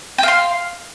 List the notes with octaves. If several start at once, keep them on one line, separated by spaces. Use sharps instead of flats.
F5 G5 C6